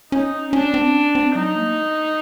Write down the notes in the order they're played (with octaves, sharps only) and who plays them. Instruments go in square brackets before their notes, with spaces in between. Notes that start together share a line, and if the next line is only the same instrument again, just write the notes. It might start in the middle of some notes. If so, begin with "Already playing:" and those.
[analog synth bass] C#4 [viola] D#4
[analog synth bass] C#4 [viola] D4
[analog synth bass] C4
C#4
C4
[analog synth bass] F#3 [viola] D#4
[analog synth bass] A#3